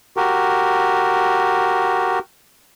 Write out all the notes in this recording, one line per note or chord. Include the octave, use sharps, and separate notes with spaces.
F#4 G4 A#4